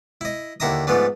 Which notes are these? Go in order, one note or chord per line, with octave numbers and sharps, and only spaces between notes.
E4 D#5
D#2 D3 E4 E5 A#5 D#6
G#2 F3 A3 B3 D4